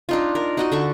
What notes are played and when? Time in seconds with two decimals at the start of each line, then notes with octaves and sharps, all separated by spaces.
0.09 D4 D#4 F4
0.35 A#4
0.57 D#4 F#4 D#5
0.72 D3 A4 C#6